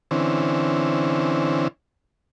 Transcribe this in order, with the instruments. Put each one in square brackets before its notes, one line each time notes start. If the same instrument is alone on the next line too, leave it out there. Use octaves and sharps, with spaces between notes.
[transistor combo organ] D3 E3 C4 C#4